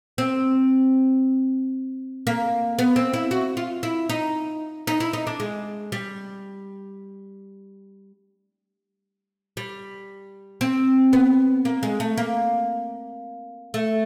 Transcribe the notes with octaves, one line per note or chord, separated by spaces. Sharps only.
C4
A#3
B3
C4
E4
F#4
F4
E4
D#4
D#4
E4
D#4
D4
G#3
G3
G3
C4
B3
A#3
G#3
A3
A#3
A3